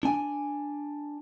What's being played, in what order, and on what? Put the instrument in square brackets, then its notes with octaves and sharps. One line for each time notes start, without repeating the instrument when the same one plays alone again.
[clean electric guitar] D4 G#5